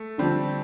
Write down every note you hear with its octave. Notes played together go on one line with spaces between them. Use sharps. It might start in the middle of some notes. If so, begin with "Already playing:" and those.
Already playing: A3
D3 F3 G3 C4 D4